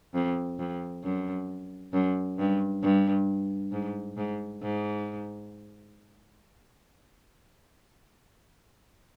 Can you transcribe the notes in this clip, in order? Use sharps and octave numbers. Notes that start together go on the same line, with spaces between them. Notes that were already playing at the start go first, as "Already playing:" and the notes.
F2
F2
F#2
F#2
G2
G2
G#2
G#2
G#2